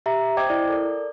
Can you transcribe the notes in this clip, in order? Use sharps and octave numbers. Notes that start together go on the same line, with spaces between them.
G4 E5 A#5
C5 D#5 G5 D6 G#6
E4 D5
A4 A#4 D5